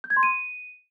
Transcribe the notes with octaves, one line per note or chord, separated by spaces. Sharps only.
G6
G#6
C6
D#7